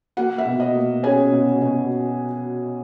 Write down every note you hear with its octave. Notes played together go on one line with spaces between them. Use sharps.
A#3 F#4 F#5
E5
B2
D#5
A#3
C#4 G#4 G#5
B2
B2